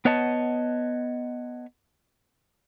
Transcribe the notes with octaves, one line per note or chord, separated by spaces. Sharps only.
B3 B4 C#5 D#5 F#5 A5